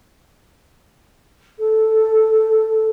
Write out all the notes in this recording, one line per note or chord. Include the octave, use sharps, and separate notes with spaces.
A4